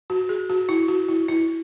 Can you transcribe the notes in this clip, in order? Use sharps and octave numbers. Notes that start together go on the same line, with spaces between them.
F#4
G#4
F#4
E4
F#4
E4
E4